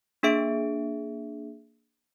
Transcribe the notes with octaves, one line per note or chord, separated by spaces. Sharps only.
A#3 D4 G#4 E5 D7